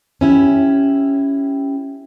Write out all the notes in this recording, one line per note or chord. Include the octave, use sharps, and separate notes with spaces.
C#4 E4 G4